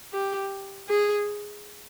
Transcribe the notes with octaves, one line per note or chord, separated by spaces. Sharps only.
G4
G#4